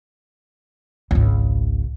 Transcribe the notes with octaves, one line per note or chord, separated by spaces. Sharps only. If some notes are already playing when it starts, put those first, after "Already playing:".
G#1 C#2